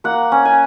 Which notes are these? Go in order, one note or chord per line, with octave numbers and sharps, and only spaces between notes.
A#3 F#5
C#4
G#5